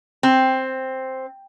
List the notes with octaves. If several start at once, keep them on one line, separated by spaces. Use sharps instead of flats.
C4